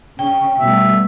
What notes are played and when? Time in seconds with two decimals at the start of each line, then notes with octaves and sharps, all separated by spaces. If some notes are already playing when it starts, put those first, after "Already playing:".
0.19 C#3 C#4 G5
0.59 B2 G3 A3 E5